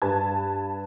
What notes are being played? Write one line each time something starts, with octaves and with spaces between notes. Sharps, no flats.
G2 B4 A5 G#6